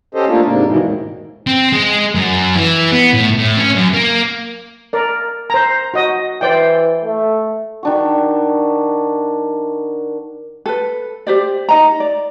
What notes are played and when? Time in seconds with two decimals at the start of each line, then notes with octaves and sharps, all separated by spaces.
0.15 C#4 G4 A4 C5 D#5
0.29 A3 A#3 D4 F4
0.45 G#2 C3 A#3 D4
0.66 G#2 B2 D#3 E3 G#3
0.85 E2 A2 D#3
1.47 C4
1.73 G#3
2.15 F#2
2.56 E3
2.92 B3
3.14 A2
3.38 A2
3.57 C#4
3.76 F#2
3.94 A#3
4.93 A#4 D5
5.50 C5 A#5
5.94 F#4 D#5
6.41 E3 C5 D5 G5
7.04 A3
7.83 D#3 D4 F#4
10.66 A4 B4
11.27 G4 C5 D5
11.69 D#4 D#5 A#5
12.00 D5